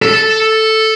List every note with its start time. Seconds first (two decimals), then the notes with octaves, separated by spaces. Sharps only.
0.02 A4